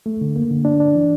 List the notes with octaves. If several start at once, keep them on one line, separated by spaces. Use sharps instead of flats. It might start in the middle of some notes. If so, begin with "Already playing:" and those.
A3
D3
A#3
D3
D4
D4
E3